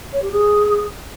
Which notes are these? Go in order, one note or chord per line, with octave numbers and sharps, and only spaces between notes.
C#5
G4
G#4